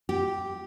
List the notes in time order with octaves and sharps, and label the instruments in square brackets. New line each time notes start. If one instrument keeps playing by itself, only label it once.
[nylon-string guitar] G4